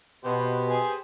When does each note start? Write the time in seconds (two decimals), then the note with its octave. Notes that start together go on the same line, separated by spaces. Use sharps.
0.25 B2 G4 B4 C5
0.68 G#4